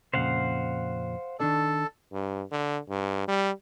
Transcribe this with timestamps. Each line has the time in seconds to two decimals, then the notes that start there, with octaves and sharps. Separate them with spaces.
0.14 F2 A#2 C#3 C5 F5 F#5
1.40 D#3 D4 A4 D5
2.12 G2
2.51 D3
2.89 G2
3.28 G3